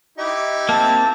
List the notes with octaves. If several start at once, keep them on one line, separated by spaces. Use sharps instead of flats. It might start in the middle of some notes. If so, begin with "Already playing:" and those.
D#4 E4 G4
A#3 C4 A5